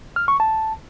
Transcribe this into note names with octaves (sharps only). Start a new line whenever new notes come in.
F6
C#6
A5